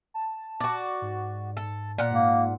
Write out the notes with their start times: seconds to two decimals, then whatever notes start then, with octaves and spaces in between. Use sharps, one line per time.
0.14 A5
0.60 F#4 D5
1.02 G#2
1.57 A4
1.98 A#2 D5 F#5
2.11 G#2 A#3